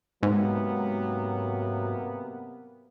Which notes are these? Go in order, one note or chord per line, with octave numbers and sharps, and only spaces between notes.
G#2 C3 F#3 A#3 B3